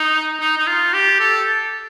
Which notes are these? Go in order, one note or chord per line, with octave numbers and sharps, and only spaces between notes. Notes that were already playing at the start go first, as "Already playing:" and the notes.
Already playing: D#4
D#4
D#4
F4
G4
A4